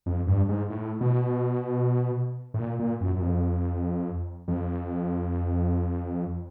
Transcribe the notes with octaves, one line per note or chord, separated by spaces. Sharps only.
F2
G2
G#2
A2
B2
A2
A#2
A#2
F#2
F#2
F2
F2